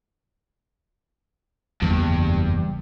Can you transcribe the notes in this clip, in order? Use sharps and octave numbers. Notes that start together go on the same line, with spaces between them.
F#1 E2 G2